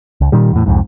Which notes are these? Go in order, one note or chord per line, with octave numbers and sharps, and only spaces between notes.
C#2
A#2 D#3 G3
E2 A2
C2 F2 G#2